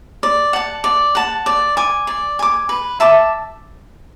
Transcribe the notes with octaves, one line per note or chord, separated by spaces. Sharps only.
D5
F#5 A5
D5
F#5 A5
D5
G#5 D6
D5
G#5 D6
B4
E5 A5 D6